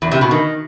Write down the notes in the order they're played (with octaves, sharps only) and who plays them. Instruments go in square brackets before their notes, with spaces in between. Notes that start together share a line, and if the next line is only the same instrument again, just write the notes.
[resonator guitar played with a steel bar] E2
C3
B2
D#3